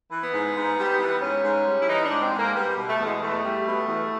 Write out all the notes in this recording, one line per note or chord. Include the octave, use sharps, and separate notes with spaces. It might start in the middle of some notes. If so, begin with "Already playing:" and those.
E3
B3
G#2
G#2
G3
E3
G#2 C#4
G#2
G3
E4
E3 D#4
D4
G#2
C4
G#2
A#3
G3 B3
B2
A3
E2 G#3
E2 A3
G3
B2
E2